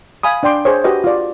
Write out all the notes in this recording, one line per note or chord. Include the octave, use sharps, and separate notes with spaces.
F5 G#5 B5 D#6
D4 D5 G5 C6 D6
G#4 C5 C#5
F#4 G4 B4 D#5
F4 D5